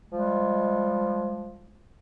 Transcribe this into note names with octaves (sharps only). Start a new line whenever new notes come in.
F3 G3 G#3